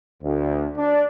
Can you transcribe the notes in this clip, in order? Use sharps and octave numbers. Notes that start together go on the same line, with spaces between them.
D2
D4